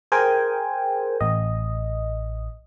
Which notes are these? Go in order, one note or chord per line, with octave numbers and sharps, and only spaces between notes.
G#4 A#4 C5 G5 G#5
A1 D#5